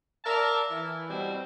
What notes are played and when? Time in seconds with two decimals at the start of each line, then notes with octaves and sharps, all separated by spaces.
0.25 A#4 D5 E5 F5 A5
0.71 E3
1.09 B2 G3 C4